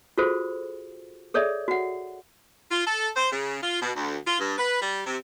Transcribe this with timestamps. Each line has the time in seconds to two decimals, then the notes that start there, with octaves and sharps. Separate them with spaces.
0.18 F4 F#4 G#4 A4 C5
1.34 G#4 A4 C#5 D5 E5
1.68 F#4 F#5
2.71 F4
2.86 A4
3.15 C5
3.32 C#3
3.63 F4
3.82 B2
3.96 D2
4.27 F4
4.40 G2
4.57 B4
4.82 G3
5.05 C3